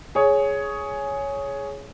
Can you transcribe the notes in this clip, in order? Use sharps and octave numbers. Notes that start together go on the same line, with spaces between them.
G#4 C#5